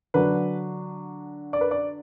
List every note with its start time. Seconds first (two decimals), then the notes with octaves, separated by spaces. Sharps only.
0.14 D3 F#3 D4 B4
1.53 D5
1.61 B4
1.71 D5